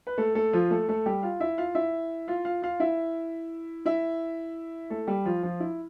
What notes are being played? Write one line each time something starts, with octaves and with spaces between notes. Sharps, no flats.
B4
A3 A4
A3 A4
F3 F4
A3 A4
A3 A4
G3 G4
F4 F5
E4 E5
F4 F5
E4 E5
F4 F5
F4 F5
F4 F5
E4 E5
E4 E5
A3 A4
G3 G4
F3 F4
F3 F4
E4